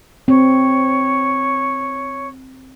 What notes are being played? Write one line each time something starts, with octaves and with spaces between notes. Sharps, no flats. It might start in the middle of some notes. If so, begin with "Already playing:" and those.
C4 C#5